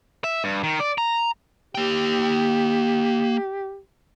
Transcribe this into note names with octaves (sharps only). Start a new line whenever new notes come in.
E5
G2
D#3
D5
A#5
A#3 G4 G5